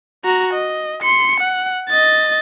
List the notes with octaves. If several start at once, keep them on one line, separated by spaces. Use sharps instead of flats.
F#4 A#5
D#5
C6 C#7
F#5
D#5 A6